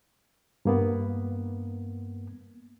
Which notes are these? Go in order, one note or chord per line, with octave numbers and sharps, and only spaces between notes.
G2 A#3 B3